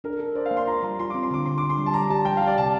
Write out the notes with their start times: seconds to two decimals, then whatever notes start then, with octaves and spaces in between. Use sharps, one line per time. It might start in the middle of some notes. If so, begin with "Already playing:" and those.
0.04 D4 A#4
0.19 A4
0.35 C5 D5
0.46 F5
0.51 A#3
0.57 C6
0.67 F4 A#5
0.83 G3 A#5
0.99 F4 C6
1.10 C4 D6
1.23 C6
1.31 D3 D6
1.46 D3 C6
1.58 D6
1.63 D3
1.70 C6
1.78 G3
1.86 A5
1.94 G3 A#5
2.10 G4 A5
2.25 G3 G5
2.37 F5
2.42 G4
2.47 D5
2.57 C3 A5